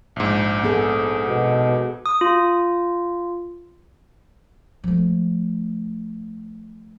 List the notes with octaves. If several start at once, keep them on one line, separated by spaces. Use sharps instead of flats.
A#1 G#2
B3 G#4 A4
B2
D#6
F4
F3 A3